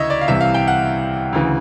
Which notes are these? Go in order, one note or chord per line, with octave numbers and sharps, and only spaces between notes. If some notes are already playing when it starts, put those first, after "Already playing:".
Already playing: D2 C#3 E3 C#5 D#5 E5
D5
F5
C2 C3 E3 E5
F5
G5
F#5
D2 C#3 E3